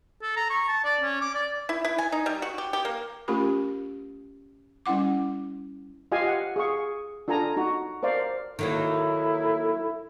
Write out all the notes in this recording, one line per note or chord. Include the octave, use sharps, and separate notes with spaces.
A4
A#5
C#6
A5
D5
C#4
D6
D5
E4
E4
G#5
D#4
G3
F#4
G4
G4
A#3
A3 C#4 F4 G4 A#4 B5
G3 C#4 E4 F#5 D6
F4 G4 D#5 F5 G#5
F#5
G#4 F5 C#6
D4 F4 A4 G#5 A#5
D#4 F#4 A#5
A#4 C5 D5 F5
D#3 F#3 A#3 E4 A4